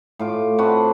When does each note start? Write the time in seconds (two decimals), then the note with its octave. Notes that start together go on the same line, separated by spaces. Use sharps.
0.19 A2 F4 D6
0.58 C4 D4 F#4 B4